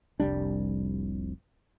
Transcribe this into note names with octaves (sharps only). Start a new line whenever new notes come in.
F1 C2 G3 D4